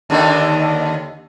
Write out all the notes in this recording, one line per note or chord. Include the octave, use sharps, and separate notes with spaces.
D#2 D3 D#3